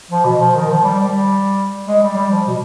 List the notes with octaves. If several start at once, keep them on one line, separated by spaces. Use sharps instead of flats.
F3
B2
F3
D#3
F3
G3
G3
G#3
G3
G3
F3
B2